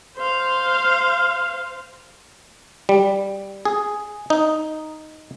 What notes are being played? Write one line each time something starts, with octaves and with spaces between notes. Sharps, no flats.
C5 F5
G3
G#4
D#4